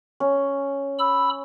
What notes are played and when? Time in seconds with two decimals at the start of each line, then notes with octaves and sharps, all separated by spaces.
0.20 C#4
0.99 B5 E6